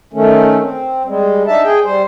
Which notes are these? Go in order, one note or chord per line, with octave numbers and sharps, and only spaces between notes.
D#3 A3 C#4
C4
G3 G#3
D4 D#4 E5 A5
G#4 G5
G3 C5